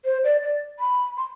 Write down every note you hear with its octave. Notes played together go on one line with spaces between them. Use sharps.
C5
D5
D5
B5
C6